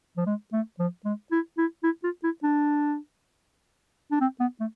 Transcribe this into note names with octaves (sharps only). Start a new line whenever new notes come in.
F3
G#3
A3
F3
G#3
E4
E4
E4
F4
E4
D4
D4
C4
B3
A3